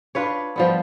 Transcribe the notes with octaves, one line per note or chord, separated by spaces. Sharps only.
D4 F4 B4 C#5
F3 G3 B3